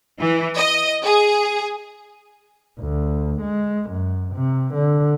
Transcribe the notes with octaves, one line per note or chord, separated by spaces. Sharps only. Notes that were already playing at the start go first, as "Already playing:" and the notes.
E3
D#5
G#4
D2
G#3
F#2
C3
D3